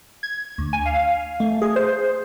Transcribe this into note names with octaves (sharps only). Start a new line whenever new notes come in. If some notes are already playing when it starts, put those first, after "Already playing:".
G#6
D2
G#5
F5
A3
G#4
C5